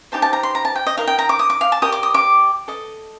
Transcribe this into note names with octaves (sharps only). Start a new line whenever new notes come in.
D#4 G4 C5 A5
A5
A#5
C6
A#5
A5
G5
D#5
D#4 A#4 D#5 F5
G5
A#5
D6
D#6
D6
F5
A5
G4 A#4 D5 D#6
D6
D#6
D6
A4 D#5